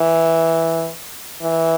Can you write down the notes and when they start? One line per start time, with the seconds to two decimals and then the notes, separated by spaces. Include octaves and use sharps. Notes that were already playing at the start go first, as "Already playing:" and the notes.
Already playing: E3
1.42 E3